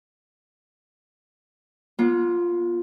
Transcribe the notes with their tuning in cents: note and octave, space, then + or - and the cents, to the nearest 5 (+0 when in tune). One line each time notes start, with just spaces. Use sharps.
B3 -40 F4 +0